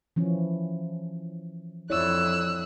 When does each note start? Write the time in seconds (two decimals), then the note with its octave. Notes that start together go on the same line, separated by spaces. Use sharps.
0.16 E3 F3 C#4
1.90 F2 E4 C#5 D5 E6 F#6